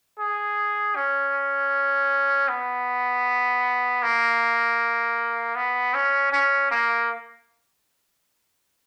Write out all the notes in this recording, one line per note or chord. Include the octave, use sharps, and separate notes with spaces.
G#4
C#4
B3
A#3
B3
C#4
C#4
A#3